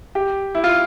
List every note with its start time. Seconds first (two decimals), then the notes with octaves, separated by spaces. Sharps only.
0.15 G4
0.55 E4
0.64 F4